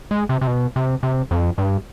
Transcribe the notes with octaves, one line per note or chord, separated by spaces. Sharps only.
G#3
C3
C3
B2
C3
C3
F2
G2